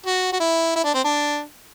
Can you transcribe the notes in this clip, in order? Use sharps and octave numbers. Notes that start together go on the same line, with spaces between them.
F#4
F#4
E4
E4
D4
C4
D4